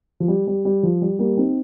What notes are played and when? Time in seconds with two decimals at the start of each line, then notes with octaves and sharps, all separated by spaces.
0.20 F3
0.28 G3
0.47 G3
0.65 G3
0.83 F3
1.02 G3
1.19 G3 A#3
1.37 C4 D#4